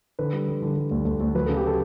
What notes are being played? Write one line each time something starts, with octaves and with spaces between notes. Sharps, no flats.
D3 B4
G3
G3
D3
G3
D2
D2
D2
F#3 B4
C#3 A4
G4
A4